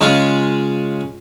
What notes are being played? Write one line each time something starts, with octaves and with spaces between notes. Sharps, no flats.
C#3 G#3 F4